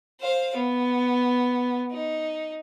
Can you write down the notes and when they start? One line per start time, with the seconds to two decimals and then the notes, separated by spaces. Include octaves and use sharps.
0.20 C5 F5
0.56 B3
1.91 D#4